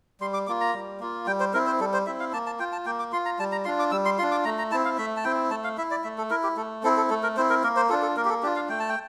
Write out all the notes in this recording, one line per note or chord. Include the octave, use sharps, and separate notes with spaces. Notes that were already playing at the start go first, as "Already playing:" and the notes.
G3 C6
D6
A#3 F4 D6
A#5
G3
A#3 F4
G3 G5
C5
C4 E4 A#4
C5
G3 A4
C5
C4 E4 E5
F5
A#3 A5
A5
F4 G5
A5
A#3 G5
D6
F4 C6
A#5
G3 A5
A#5
D4 F4 C6
D6
G3 E6
C6
D4 F4 C6
D6
A3 A#5
A#5
C4 E4 A5
F5
A3 E5
A5
C4 E4 G5
A3 A5
F5
E4 E5
D5
A3 E5
A4
E4 A#4
G4
A3 A4
C4 E4 A4
A4
A3 A4
A#4
C4 E4 C5
A#4
A#3 A#4
C5
D4 F4 A4
A4
A#3 A#4
G4
A4
D4 F4 G4
F5
A3 G5
A5
G5